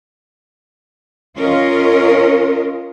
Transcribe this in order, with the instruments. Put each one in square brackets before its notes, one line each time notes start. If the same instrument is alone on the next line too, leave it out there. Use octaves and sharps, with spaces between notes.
[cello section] C#4 F4 A#4 D#5